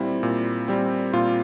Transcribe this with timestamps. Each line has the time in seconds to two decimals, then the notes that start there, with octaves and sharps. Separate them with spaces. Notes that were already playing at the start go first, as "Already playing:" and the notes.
Already playing: A#2 G3 C4 E4
0.23 A#2
0.68 G3 C4
1.13 A#2 F4